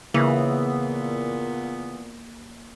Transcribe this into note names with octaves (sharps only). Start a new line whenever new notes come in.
A#2 C#3 E3 A#3 B3